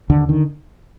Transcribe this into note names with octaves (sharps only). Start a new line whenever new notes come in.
D#2 D3
D3 D#3